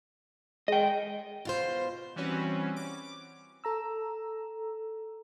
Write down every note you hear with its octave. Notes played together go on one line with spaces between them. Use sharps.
G#3 D#5 G5
B2 F4 C5
E3 G3 C4 C#4 F#4 B4
D6
A4 A#5 E6